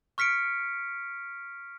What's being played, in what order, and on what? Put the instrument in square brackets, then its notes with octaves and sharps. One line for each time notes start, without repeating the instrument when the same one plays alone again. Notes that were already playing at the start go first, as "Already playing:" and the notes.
[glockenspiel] C#6 F6 B6 C#7 D7